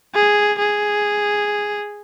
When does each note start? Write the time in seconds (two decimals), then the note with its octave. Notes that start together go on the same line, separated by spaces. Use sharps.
0.14 G#4
0.58 G#4